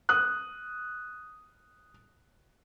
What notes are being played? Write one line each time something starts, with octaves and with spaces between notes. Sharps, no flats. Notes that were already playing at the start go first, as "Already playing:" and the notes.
D#6 F#6